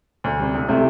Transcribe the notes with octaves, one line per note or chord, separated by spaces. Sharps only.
D2
C3 G3
C2
C3 A3 E4